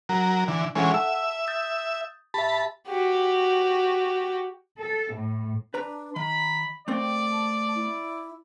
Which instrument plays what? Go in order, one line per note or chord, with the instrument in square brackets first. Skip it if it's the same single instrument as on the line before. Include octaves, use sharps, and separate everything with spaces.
[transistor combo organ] F#3 A#4
[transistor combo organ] D3 E3 [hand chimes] D4
[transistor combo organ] E3 G#3 C#4 [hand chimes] A4 F#5
[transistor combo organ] E5 [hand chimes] A5 E6
[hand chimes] D#6 G6 A6
[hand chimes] G4 E5 [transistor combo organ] A5 B5
[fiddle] F#4 G4
[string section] A4
A2
[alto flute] D4 [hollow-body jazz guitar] B4 A#5
[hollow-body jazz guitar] D#3 [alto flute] A#5 [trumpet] B5
[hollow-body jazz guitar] A3 A#3 C4 [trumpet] D5 [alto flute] G5
[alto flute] A5
E4